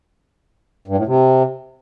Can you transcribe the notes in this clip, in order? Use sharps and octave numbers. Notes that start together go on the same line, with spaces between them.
G2
A2
C3